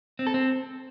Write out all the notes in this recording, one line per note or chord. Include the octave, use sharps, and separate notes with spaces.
C4
A4
C4